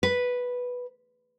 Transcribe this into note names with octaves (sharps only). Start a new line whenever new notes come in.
B4